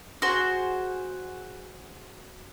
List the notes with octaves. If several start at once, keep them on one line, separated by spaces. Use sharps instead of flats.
F#4 G#4 C5